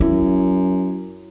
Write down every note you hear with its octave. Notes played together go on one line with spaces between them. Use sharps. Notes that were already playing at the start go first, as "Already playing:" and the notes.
F#2 E4